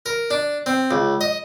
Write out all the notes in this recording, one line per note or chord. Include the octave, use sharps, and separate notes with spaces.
A#4
D4
C4
C#2
D#5